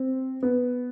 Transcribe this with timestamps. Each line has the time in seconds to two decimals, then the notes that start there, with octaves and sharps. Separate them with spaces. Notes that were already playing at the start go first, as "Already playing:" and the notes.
Already playing: C4
0.43 B3